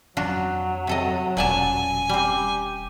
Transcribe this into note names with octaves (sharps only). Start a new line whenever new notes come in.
F2 F#3 D4 F4 F#4
C3 A4 D#5
E1 A#2 C#4 D5 G#5 A5
G3 C4 G4